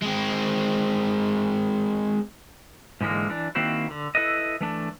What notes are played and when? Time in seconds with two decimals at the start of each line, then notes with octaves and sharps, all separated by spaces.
0.02 G#3 C4
3.01 G#2 D3 E3 G#3 A#3
3.29 E3 D4
3.55 D#3 A#3 C4 E4 F#4 C5
3.90 D3
4.15 E4 A4 B4 D#5
4.61 E3 A3 D4